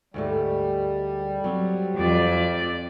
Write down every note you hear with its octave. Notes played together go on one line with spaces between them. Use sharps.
D2 G#2 G3 A3
F#3 C4
F2 D5